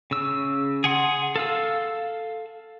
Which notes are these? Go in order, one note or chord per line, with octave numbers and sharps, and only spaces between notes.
C#3 E6
G#4 F#5 C6
A4 F5 E6